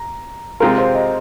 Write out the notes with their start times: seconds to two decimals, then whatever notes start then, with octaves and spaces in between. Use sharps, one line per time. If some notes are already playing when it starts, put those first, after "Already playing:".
Already playing: A#5
0.60 C3 G#3 C4 F4 A#4 F5 A#5
0.78 C5 F5
0.94 D#5